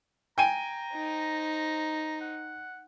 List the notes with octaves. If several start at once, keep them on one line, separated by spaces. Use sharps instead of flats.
G5 G#5 A#5 D#7
D#4 C5
F#5